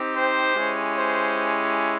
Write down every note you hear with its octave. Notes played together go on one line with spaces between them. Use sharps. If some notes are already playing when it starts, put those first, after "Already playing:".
Already playing: C4 D#4 G4
C5
G#3 C#4 E4 G4
C5